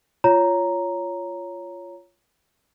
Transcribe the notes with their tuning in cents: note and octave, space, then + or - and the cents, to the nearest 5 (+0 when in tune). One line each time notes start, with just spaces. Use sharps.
F4 -10 C#5 +5 A#5 +0